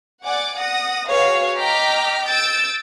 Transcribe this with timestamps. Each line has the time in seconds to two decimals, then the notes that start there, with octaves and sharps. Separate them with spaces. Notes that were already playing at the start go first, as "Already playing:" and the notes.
0.24 D5 F#5 G#5 D6
0.57 F#5 D#6 A#6
1.09 F#4 G#4 B4 C#5 F5
1.58 D#5 G5 A#5 D6 F6 B6
2.27 E6 G6 A6 D7